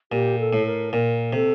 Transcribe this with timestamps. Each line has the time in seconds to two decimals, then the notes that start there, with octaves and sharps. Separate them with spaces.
0.12 A#2 G4
0.39 A4
0.53 A2
0.66 A#4
0.93 A#2 A#4
1.33 C3 A4